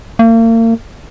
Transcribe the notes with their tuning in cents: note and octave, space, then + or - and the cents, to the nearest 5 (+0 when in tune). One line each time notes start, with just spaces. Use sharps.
A#3 -40